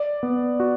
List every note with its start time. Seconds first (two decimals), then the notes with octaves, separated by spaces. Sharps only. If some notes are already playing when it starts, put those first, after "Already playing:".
Already playing: D5
0.23 B3
0.60 F#4